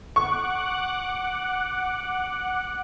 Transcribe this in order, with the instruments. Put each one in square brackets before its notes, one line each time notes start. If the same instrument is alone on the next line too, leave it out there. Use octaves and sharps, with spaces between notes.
[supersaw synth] F#5 D6 F#6 [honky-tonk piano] C#6